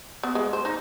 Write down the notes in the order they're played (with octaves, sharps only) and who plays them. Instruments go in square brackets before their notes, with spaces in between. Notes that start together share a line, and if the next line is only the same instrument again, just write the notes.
[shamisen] B3
G#3
C5
D#4